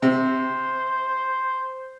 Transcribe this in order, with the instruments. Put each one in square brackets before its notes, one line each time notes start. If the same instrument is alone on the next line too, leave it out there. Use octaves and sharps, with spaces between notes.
[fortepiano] C3 [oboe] C5